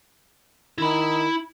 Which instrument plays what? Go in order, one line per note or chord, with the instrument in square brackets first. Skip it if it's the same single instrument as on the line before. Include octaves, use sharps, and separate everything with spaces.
[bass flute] D#3 [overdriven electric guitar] E4 B5